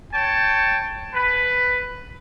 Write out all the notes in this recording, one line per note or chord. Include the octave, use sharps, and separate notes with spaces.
C#5 G5 A5
B4